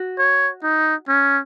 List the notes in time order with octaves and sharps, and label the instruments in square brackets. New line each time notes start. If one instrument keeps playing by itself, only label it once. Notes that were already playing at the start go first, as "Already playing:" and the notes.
Already playing: [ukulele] F#4
[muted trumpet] C#5
D#4
C#4